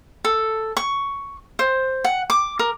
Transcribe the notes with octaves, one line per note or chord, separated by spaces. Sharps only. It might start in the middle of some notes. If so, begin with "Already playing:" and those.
A4
C#6
C5
F#5
D6
A#4